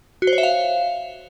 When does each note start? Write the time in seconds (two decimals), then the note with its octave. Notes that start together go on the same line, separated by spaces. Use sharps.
0.22 F#4
0.27 C5
0.33 C#5
0.38 E5
0.43 F5